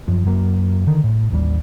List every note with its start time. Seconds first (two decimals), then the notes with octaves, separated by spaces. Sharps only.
0.08 F#2 F3
0.25 F#2 F#3 A#3
0.87 D3 D#3
1.04 A2
1.31 A1 D#2 G3